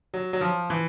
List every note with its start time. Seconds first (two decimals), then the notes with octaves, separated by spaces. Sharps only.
0.14 F#3
0.33 F#3
0.41 F3
0.70 E3